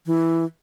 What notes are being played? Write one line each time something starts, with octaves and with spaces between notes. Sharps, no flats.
E3